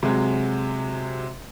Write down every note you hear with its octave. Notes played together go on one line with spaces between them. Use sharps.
C3 F#3 G#3